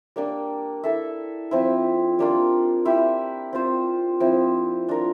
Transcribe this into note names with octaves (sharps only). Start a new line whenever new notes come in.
G3 A#3 D4
E4 A4 E5
F3 C4 E4
G3 A#3 D4 F4
E4 G4 C5
C4 F4 C5
F3 C4 E4
D4 F4 A#4